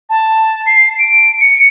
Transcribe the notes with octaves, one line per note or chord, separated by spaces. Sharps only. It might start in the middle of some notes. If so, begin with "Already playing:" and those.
A5
C7
D7
C#7